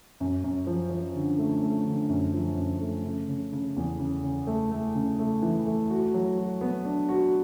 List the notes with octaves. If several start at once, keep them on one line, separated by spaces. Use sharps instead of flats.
F#2
F#2
F3
F3
D3
A3
A3
D3
F#2
F3
F#2
A3
C#3
C#3
C#3
E2
C#3
C#3
A3
A3
C#3
A3
E3
A3
F#4
F#3
F#4
B3
D4
F#4